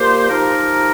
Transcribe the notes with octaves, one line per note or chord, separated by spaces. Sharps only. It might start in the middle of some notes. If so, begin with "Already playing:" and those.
Already playing: A#2 A#3 G4 C5
F3 D#4 G4 A#4